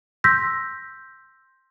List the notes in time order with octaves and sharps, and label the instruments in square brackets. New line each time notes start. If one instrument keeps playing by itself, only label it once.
[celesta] C6 E6 G6 A#6 B6